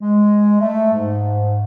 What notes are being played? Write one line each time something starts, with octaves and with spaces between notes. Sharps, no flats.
G#3
A3
G#2